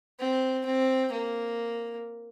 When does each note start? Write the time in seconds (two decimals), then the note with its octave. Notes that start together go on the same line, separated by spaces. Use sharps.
0.19 C4
0.66 C4
1.12 A#3